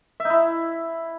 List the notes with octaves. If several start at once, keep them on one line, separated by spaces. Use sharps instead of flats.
E5
D#4
E4